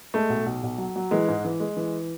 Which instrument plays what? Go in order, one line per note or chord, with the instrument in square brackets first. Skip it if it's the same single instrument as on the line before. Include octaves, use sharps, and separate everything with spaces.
[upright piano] G#3 A3
B1
B1
B1
F#3
F#3
E3 G#3
G#2
E3
G#3
E3